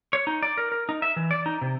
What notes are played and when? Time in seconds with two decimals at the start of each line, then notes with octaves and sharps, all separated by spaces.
0.13 C#5
0.27 D#4
0.43 D5
0.57 A#4
0.72 A#4
0.89 D#4
1.02 E5
1.16 E3
1.31 D5
1.46 D#4
1.61 C3